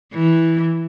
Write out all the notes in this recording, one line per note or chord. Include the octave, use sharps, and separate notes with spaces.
E3